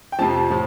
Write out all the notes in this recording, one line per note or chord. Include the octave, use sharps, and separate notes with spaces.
G5
F2 C3 F3 A5
A2 F3